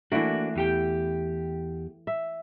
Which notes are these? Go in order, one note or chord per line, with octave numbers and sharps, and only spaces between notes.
E3 A3 A#3 D4 F#4
E2 G4 G5
E5